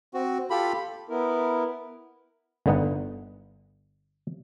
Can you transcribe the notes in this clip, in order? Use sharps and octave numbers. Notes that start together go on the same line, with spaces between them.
C4 F#4
F4 G4 A4 B5
B3 E4 A#4
G1 D3 B3 D#4 F#5